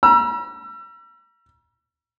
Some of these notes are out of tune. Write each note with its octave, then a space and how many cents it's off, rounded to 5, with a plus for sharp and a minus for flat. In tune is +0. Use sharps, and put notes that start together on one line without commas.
A#5 +45 E6 +35